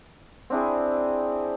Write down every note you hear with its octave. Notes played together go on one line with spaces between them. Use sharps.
C4 D4 E4 G#4